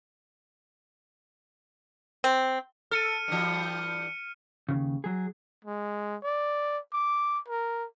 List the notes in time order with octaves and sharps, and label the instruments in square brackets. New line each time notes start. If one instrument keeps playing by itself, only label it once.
[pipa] C4
[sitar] A4 [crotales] F6 C#7 D#7
[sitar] G2 E3
[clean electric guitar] D#2 G#2 C#3
F#3 G#4
[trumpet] G#3
D5
D6
A#4